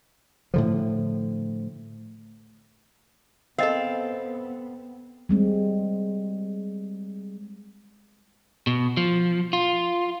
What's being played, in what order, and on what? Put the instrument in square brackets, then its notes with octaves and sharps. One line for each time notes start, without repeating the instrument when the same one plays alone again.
[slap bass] A2 D3 F3
[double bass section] B3 [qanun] C4 [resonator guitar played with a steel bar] A4 F5 [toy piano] A#4 D#5
[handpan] G3 G#3 C4
[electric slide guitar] B2
F3
F4